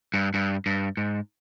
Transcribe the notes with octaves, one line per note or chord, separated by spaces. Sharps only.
G2
G2
G2
G#2